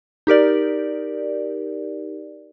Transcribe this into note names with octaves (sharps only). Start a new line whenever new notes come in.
D#4 G4 A#4 D5